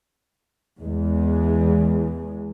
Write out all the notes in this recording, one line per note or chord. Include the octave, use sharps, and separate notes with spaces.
E2 G#3